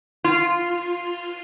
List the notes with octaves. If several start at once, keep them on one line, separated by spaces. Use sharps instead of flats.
F4